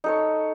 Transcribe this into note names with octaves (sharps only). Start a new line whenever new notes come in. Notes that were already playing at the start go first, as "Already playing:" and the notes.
D#4 A4 C#5